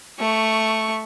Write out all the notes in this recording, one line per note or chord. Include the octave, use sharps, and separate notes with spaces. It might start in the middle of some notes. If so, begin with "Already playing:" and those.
A3 C#6